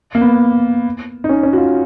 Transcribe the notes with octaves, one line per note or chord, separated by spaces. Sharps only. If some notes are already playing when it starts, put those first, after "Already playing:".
A#3
B3
D#4
C#4
C#4
F#4
F4